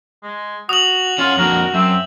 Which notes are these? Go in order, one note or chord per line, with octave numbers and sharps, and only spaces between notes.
G#3
F#4 D#6 F#7
C#4 F4 F#4
F2 D3 F#4 A#4
F#2 C4 E5